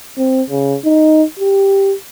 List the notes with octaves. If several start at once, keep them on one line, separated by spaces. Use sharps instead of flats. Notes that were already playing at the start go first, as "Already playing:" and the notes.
C4
C#3
D#4
G4